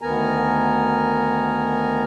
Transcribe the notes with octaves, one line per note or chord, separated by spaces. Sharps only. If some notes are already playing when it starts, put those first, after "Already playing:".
D2 D#3 B3 A#4 G#5 A#5